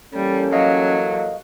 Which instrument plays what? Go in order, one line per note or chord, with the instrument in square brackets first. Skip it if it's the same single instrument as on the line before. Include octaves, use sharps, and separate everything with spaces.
[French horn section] E3 A#3 A4 [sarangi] G3 [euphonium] C#4
[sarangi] F#3 [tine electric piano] D#5 F5